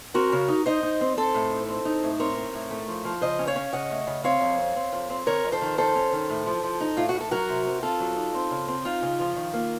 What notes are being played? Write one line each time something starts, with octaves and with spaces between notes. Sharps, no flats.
C4 F#4 A#4
C#3
D#4
D#4 C5 D#5
D#4
C4
C4 A4 C5
A2
D#4
C4
D#4
A2
C4 A#4 C#5
C4
A2
A3
F3
F3
C#3 C5 D#5
C#4
C#5 F5
C#4
C#3 D#5 F#5
A3
C#3
C4 C#5 F5
F2
C4
C4
F2
C4
D#3 A#4 C#5
F2
A4 C5
D#3
F2 A4 C5
C#4
D#3
A2
F3
F3
D#4
A2 F4
F#4
A2
A4
F#3 F#4 A#4
C3
C4
C4 F4 A4
F#3
D#4
C4
C#3
C4
D#4 F4
C#3
F3
D#3
A#3